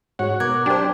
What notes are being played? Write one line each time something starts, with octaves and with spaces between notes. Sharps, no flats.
G#2 F#4 C#5 F#5
B2 A#4 D6 F#6 G#6
F#3 D4 G4 C5